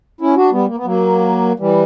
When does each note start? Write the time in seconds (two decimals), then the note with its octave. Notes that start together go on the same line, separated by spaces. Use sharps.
0.21 C#4 E4
0.36 D4 F#4
0.52 G3 B3
0.67 A#3
0.77 B3
0.85 F#3 A#3
1.59 E3 G3